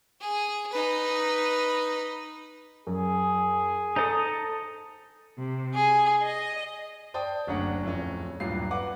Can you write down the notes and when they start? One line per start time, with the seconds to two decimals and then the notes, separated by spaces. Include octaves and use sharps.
0.21 G#4
0.72 D#4 B4
2.87 F#2 G#4
3.96 D#4 A4 C5 D#6
5.38 C3
5.75 G#4
6.24 D#5
7.14 C5 D5 G5 A5 D#6
7.47 F#1 D2 F#3 C#4 D4 F#5
7.83 D1 F2 C#4
8.40 D#1 A1 G2 F#3 F4 C7
8.71 B4 F#5 D6